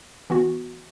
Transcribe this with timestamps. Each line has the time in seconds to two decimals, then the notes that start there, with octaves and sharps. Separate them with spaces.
0.30 E3 B3 F#4